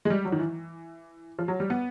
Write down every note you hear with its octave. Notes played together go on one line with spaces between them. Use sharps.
G#3
G3
F#3
D#3
E3
F3
F#3
G3
B3